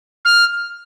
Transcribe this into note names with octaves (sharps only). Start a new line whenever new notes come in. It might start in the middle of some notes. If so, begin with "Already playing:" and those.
F6